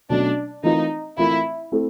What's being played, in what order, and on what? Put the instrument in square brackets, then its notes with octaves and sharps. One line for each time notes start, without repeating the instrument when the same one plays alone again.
[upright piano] B2 F#3 A3 C#4 [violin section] D4
[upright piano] E3 A3 C4 F4 A#4 [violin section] D#4
[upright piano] E3 A3 C4 F4 A#4 [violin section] E4
[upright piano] A3 C4 E4 A4